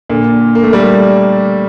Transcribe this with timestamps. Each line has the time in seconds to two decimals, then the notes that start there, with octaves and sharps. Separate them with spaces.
0.09 A#2 D3
0.55 A#3
0.63 A3
0.72 G3 A#3